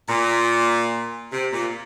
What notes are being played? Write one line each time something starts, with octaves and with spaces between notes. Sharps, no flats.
A#2
C3
A#2